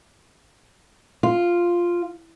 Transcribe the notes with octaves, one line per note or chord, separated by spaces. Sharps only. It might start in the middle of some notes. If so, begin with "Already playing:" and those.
F4